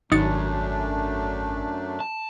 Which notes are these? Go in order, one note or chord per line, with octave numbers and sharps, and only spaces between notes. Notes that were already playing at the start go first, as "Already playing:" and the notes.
G#1 F#2 A3 D4 D#4 A6 C#7
A5